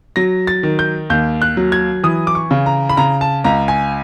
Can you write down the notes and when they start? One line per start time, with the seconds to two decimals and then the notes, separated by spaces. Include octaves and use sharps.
0.16 F#3 A#6
0.47 A6
0.63 D#3
0.79 G6
1.10 D#2 G6
1.42 F#6
1.57 F#3
1.72 G#6
2.03 E3 D#6
2.27 D6
2.35 C#6
2.51 C#3
2.66 A#5
2.89 B5
2.97 C#3 A#5
3.21 A5
3.44 C#2 A#5
3.68 G#5